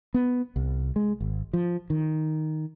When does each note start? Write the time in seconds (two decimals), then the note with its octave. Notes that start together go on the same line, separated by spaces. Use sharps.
0.14 B3
0.56 C2
0.96 G#3
1.21 G#1
1.53 F3
1.90 D#3